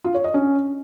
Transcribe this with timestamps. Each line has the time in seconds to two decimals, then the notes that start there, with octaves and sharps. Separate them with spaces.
0.04 F4
0.14 C#5
0.24 D#5
0.34 C#4